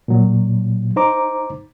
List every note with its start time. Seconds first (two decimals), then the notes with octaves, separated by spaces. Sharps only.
0.08 A#2 F#3
0.96 D#4 C5 A#5 D6